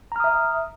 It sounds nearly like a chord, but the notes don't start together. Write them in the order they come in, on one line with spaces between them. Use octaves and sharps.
A#5 F6 D#6 E5